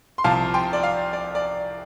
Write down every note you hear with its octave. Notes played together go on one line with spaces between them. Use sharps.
C6
C2 C3 F3 F5 A5
G5 C6
D5
F5
D5
D5